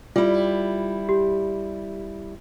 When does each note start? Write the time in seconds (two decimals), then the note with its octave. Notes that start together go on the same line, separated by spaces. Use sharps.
0.16 G3 E4 F4
1.09 G4